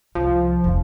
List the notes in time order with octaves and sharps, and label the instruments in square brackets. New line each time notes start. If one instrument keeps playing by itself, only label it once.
[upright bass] C2 [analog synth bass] F3
[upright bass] E1 C#3